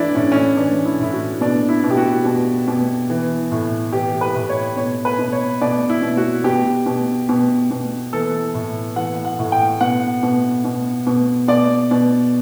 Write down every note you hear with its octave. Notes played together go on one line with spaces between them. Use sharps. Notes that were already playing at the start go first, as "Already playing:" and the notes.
Already playing: E3 D4 E4
A2 C#4
C#4
D4
E3 D4
E4
A2 E4
F#4
B2 D4
E4
B2
G4
F#4
B2
B2
E3
A2
E3 G4
B4
A2
C#5
B2 C#5
B4
B2
C#5
B2 D5
E4
B2
F#4
B2 G4
B2
B2
B2
E3 A4
A2
E3 F#5
F#5
A2
G5
B2 F#5
B2
B2
B2
B2 D5
B2